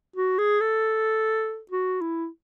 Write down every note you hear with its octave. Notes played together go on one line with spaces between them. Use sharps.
F#4
G#4
A4
F#4
E4